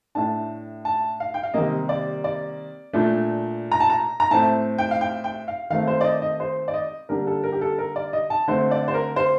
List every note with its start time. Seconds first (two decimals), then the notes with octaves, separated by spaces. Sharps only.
0.15 A2 A3 D4 A5
0.85 A5
1.20 F5
1.34 G5
1.43 F5
1.54 C3 D#3 G3 A#3 D#5
1.89 D5
2.24 D5
2.93 A#2 A3 D4
3.72 A#5
3.80 A5
3.90 A#5
4.20 A#5
4.31 A2 A3 C4 A5
4.78 G5
4.91 F5
5.01 G5
5.24 G5
5.48 F5
5.70 D#3 A3 C4 F5
5.87 C5
6.01 D5
6.04 D#5
6.22 D#5
6.40 C5
6.68 D5
6.74 D#5
7.09 D3 G3 A#3 D4 A#4
7.27 A4
7.43 A#4
7.52 G4
7.61 A4
7.78 A#4
7.96 D5
8.13 D#5
8.30 A5
8.48 D3 A3 C4 C5
8.71 D5
8.88 C5
8.94 A#4
9.16 C5